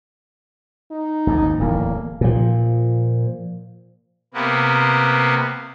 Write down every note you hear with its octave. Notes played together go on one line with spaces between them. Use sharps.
D#4
G#1 D#2 G#2
D1 E2 A2 A#3
A#2 F3
C3 A#3 B3